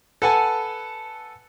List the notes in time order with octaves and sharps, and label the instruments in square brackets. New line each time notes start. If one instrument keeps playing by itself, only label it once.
[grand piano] A4 B4 F#5 G#5 A5